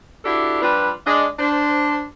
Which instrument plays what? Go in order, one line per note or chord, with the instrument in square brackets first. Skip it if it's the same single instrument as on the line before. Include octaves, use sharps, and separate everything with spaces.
[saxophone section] D4 E4 F#4 G4 A4 D5
F3 G3 D4 F4 B4
G#3 D4 D#5
D4 C5